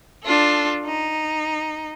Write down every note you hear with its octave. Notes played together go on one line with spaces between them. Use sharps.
D4 F4 A4
D#4